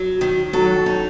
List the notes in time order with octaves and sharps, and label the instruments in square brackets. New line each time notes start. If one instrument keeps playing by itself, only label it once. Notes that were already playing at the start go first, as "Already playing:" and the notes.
Already playing: [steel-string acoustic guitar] F#3
D#3
[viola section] F#3 [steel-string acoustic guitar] A4
[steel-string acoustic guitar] D#4